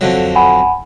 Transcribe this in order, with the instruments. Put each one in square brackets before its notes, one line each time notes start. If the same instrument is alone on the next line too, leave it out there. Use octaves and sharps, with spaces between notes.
[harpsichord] F2 D3 F#3
[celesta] F#5 G#5 B5